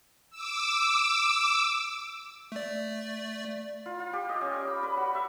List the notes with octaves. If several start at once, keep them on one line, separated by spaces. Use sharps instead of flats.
D6 E6
A3 D5
F4
F4
G4
D#5
C#4
D5
B5
B4
F#4
E5